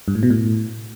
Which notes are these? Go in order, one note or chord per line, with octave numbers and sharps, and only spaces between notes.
G2
A2
B2
A2